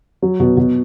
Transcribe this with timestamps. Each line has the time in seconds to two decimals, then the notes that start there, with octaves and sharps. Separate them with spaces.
0.22 F#3
0.40 B2
0.57 B2